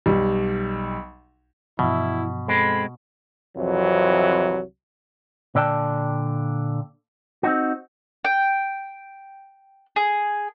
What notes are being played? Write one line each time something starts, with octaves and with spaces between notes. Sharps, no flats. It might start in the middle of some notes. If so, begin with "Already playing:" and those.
B1 G3
G2 B2 E3 F3 E4
G#3 C4 A4 B5
C2 F2 E3 F#3
A#2 D3 D5 G5 A5
C4 D#4 F#4
G5
G#4